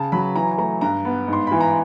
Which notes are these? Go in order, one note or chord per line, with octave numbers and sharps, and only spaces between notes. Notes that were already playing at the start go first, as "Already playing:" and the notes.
Already playing: C#3 A5
F#3 B5
E3 A#5
A3 A#5
G2 A#5
B3
G#2
C6
E3 B5
A#5